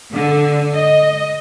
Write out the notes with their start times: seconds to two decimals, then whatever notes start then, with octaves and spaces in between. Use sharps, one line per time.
0.12 D3
0.75 D#5